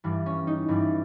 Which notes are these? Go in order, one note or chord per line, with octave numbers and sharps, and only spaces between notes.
G2 E3 G3
C#4
D#4
G2 E3 G3